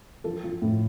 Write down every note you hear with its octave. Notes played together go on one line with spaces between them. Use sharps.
F3 A4
F3
A2